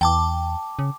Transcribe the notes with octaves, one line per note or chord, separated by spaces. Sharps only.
E2 G5 A5 D6
C#3